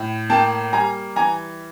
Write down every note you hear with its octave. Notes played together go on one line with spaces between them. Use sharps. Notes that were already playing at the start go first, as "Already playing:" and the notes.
Already playing: A2
A#3 G5 A5
G3 G#5 A#5
E3 G#5 A#5